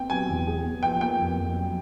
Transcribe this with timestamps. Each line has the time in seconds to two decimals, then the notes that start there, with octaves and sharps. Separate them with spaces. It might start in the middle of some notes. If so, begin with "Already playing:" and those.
Already playing: C4 G5
0.10 F#3 G#5
0.29 E2
0.47 G#4
0.64 B3
0.83 F3 G5
1.01 A#3 G5
1.19 F2
1.37 F2
1.56 F#3